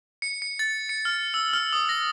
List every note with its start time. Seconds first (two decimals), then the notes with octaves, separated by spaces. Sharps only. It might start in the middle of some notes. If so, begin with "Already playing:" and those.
0.22 C#7
0.42 C#7
0.59 A6
0.89 C#7
1.05 F6
1.34 E6
1.53 F6
1.73 D#6
1.89 A#6